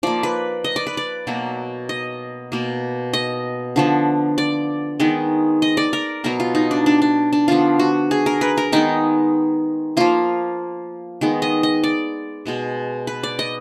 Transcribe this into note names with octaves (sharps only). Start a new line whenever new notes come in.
F3 A#3 D5
B4
D#5
D5
B4
D5
B2 F#3 A#3
D#5
B2 A#3
D#5
D3 F3 B3
D5
D#3 G#3 B3
D#5
D5
A#4
B2 F#3 B3 A#4
F4
D#4
D4
D4
D4
D4
D3 F3 B3 F4
F#4
G#4
A#4
B4
A#4
D#3 G#3 B3 D#4
F3 A#3 F4
D#3 G#3 B3
D#5
D#5
D5
B2 G#3 B3
B4
D5
D#5